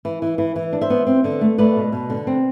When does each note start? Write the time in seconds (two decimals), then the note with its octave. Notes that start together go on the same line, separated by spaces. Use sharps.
0.05 E3
0.22 E3
0.38 E3
0.56 E3
0.73 D4
0.81 C5 E5
0.90 B3
1.07 C4
1.24 D3
1.41 A3
1.58 A3 B4 D5
1.76 B2
1.92 B2
2.10 D3
2.27 C4